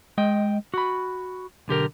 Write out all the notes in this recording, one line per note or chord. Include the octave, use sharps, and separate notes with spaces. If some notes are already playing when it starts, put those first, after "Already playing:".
G#3 D#5 G5
F#4 B5
B1 D3 G4 A#4